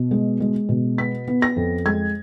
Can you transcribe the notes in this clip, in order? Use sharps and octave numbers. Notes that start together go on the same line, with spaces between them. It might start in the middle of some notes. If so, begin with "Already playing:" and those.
Already playing: B2
G#3
G#3
B2
B3 B6
B3
A#6
F2
G#3 G#6